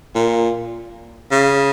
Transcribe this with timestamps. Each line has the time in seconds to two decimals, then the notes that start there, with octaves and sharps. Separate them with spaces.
0.15 A#2
1.31 C#3